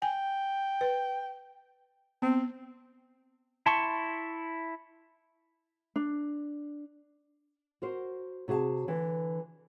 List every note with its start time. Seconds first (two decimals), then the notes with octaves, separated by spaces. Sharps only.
0.02 G5 G#5
0.81 B4
2.22 B3 C4
3.66 E4 A5 C6 C#6
5.96 D4
7.82 F#4 A#4 C5
8.48 C3 F#4 G#4 F5 A5
8.88 D3 E3